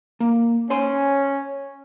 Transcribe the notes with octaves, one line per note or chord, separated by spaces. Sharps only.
A#3
C#4 C5 G#5 C6